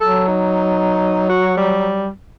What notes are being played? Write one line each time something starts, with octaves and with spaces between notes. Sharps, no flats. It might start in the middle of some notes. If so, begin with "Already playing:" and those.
F#3 A4
D#4
F#4
G3